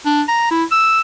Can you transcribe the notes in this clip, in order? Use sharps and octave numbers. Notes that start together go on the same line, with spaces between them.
D4
A#5
E4
E6